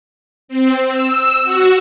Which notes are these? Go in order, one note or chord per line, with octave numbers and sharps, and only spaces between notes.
C4
E6
F#4